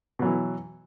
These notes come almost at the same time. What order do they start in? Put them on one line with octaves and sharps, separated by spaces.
B2 F#3 E3